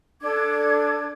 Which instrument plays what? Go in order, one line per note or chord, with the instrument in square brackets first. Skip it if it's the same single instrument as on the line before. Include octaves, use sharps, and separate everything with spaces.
[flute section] D4 A4 D6 G#6